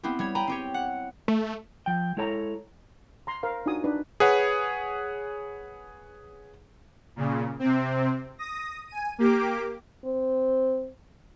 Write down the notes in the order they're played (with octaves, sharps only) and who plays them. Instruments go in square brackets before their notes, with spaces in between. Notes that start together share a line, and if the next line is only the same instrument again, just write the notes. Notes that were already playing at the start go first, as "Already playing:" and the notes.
[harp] B3 C4 E4 G4
G3 C#5 G#6
G5 G#5 A#5 B5
C4 G4 C#5
F#5
[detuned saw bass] A3
[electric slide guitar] F3 G5
G#3 E4 A4 C#5 A5 A#5
[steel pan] A#5 C6
A#4 C5 F5
D4 D#4 F4 F#4 G#5 D#6
D4 D#4 B4
[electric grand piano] G#4 B4 C#5 F#5
[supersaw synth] A#2 C#3
C3 C4
D#6 A#6
G#5 D#7
A#3 G4 D6
[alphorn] C4